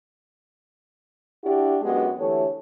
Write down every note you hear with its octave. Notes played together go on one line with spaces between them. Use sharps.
D4 E4 F#4 G4
F#2 G#3 B3 D4 F#4 G4
D3 E3 A3 G4 C#5